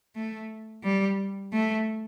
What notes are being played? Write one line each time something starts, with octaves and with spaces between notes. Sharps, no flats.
A3
G3
A3